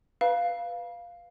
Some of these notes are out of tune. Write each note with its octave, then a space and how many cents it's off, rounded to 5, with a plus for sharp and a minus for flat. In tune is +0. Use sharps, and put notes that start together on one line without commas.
B4 +0 F5 +0 B5 -45